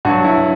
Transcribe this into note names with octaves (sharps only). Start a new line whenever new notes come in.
G2 F#3 F#4
E4